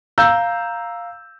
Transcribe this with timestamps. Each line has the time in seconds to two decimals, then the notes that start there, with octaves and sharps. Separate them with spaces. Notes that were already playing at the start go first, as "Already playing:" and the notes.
0.18 F5 A#5 E6 G6